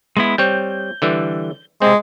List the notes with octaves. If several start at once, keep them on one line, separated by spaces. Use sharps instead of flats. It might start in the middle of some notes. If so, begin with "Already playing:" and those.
G#3 B3 E4
G3 C4 C#5 G6
D3 E3 G3
C3 G#3 C4